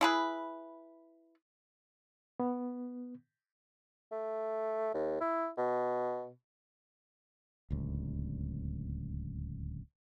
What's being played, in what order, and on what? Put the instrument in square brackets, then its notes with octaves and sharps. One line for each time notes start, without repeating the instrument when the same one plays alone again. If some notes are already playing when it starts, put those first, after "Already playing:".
[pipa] E4 G#4 B4
[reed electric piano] B3
[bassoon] A3
D#2
E4
B2
[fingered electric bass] D1 C#2